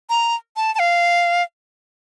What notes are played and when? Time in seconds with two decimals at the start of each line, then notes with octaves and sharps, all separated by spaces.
0.10 A#5
0.56 A5
0.75 A5
0.79 F5